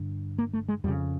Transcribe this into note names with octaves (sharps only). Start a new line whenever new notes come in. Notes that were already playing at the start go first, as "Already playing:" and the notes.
Already playing: G2 D3
A#3
A3
G#3
F2 C#3 G3